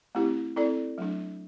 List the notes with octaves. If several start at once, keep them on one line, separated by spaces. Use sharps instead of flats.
A3 C4 E4 G4
C4 E4 A4 D5
F#3 A3 D4